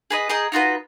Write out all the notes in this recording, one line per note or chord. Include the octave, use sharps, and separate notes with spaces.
G#4 B4 D#5
G#4 D#5 G5 A#5
D#4 F4 F#4 B4